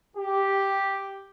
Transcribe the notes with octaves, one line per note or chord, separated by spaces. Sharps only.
G4